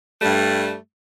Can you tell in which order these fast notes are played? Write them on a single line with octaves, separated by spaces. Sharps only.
A3 G3 G2